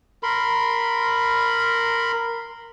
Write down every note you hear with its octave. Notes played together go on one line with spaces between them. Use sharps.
A#4 B5 C6